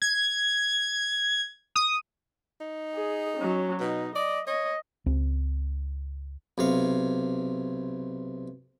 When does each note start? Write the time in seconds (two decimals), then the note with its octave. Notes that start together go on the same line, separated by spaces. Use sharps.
0.02 G#6
1.76 D#6
2.61 D#4
2.94 G#4
3.37 F#3 C#4
3.80 B2 D#4
4.16 D5 D#5
4.47 C#5 D#5
5.06 C#2 C4
6.58 B1 C3 F5